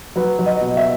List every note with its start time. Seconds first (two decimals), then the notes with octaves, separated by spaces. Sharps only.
0.16 F#3 B4
0.39 F#3
0.46 D#5
0.61 B2
0.77 E5